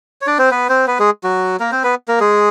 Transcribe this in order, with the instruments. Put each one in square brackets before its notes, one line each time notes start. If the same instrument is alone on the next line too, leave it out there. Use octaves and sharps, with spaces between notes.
[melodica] C#5
D4 D5
C4 C5
B3 B4
C4 C5
B3 B4
G#3 G#4
F#3 F#4
A#3 A#4
C4 C5
B3 B4
A#3 A#4
G#3 G#4